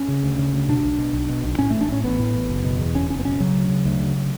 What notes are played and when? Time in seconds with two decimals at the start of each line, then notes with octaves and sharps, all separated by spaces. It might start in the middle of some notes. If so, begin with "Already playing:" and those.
Already playing: C#4
0.08 C#3
0.23 D2
0.39 C#3
0.53 D2
0.69 B2 D4
0.84 B1
0.98 B2
1.13 B1
1.29 B2
1.44 B1
1.59 A2 C#4
1.70 A1 A3
1.81 D4
1.89 A2 C#4
2.04 A1 B3
2.19 A2
2.35 A1
2.50 F#1
2.65 B2
2.79 E2
2.94 F#1 C#4
3.10 F#1 C#4
3.19 B3
3.25 B2 C#4
3.40 C#3 F#3
3.54 D2
3.69 C#3
3.85 D2
4.00 C#3